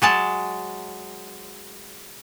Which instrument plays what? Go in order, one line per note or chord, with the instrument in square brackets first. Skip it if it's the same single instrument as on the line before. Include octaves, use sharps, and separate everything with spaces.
[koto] F#3 G#3 A5